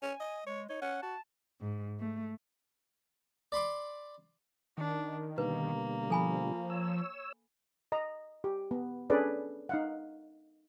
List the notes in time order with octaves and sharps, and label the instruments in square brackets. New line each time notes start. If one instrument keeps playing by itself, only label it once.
[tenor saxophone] C#4 [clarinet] G#5
[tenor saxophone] D#5
[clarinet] G#3 [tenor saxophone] C#5
[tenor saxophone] D#4 [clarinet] C#5
[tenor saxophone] C#4 [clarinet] F#5
[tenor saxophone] F#4 [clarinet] A5
[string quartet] G#2
A3
[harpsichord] D5 B5 C6 D6
[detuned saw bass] D#3 [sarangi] D4
[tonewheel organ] B2 D3 G3 [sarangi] A#3 [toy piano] B4
[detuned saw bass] F3 [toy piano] A4 G#5 B5
[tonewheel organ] C#5 E6
[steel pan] D#5 A#5
G4
B3
C#4 D4 G#4 A4 B4 D5
D#4 F5 F#5